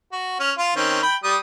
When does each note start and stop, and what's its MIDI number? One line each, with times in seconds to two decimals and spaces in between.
0.12 0.35 66
0.40 0.52 61
0.40 0.52 89
0.58 0.76 65
0.58 0.76 77
0.76 1.02 51
0.76 1.02 60
0.76 1.02 61
1.03 1.16 79
1.03 1.16 83
1.24 1.37 55
1.24 1.37 87